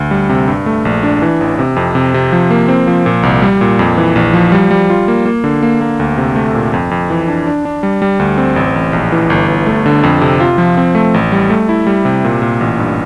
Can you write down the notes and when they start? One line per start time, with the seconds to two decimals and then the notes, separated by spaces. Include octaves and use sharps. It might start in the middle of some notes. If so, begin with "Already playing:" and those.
Already playing: D2
0.11 G3
0.29 C3
0.48 G2
0.66 A3
0.85 A#1
1.03 D4
1.22 E3
1.41 A1
1.59 C3
1.76 F2
1.95 C3
2.14 C3
2.32 F3
2.50 A#3
2.68 C4
2.88 F3
3.06 A#2
3.23 C2
3.42 G3
3.61 A#2
3.79 F2
3.98 E3
4.16 A#1
4.33 F3
4.52 G3
4.71 G3
4.90 F4
5.08 A#3
5.25 A#3
5.44 D3
5.63 A#3
5.81 A#3
6.00 D2
6.18 C3
6.36 A3
6.55 A#2
6.73 F2
6.91 F2
7.10 E3
7.28 D4
7.47 D4
7.65 D4
7.83 G3
8.02 G3
8.19 D2
8.38 C4
8.56 A1
8.76 A1
8.93 A#1
9.12 E3
9.30 G1
9.48 G1
9.66 A3
9.86 D3
10.03 F2
10.21 C3
10.40 F4
10.58 F3
10.77 C4
10.95 A3
11.14 A1
11.32 G3
11.50 A3
11.69 E4
11.87 G3
12.05 C3
12.24 A#2
12.42 A#2
12.61 A1
12.79 G2